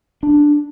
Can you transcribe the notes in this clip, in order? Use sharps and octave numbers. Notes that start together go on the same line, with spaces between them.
D4